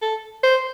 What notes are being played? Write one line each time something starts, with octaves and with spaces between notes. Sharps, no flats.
A4
C5